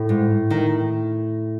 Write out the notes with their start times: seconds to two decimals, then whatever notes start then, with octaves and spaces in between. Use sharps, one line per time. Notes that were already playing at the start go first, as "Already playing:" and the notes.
Already playing: A2 A3
0.09 G#2
0.51 D#3